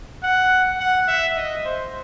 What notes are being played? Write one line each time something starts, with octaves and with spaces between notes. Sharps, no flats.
F#5
F#5
E5
D#5
C5